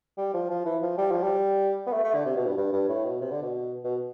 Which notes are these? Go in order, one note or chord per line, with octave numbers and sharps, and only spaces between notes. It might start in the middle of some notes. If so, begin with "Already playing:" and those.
G3
F3
F3
E3
F3
G3
F3
G3
B3
A3
A3
D3
C3
B2
G2
G2
G2
A2
B2
C3
D3
B2
B2